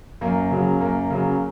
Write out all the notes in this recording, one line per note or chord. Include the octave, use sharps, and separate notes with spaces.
F#2 A#3
C#3 F#3
F#2 A#3
C#3 F#3